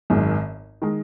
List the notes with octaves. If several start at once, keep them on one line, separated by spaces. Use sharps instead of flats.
G#1 F#2 D#3 G#3
D#3 G#3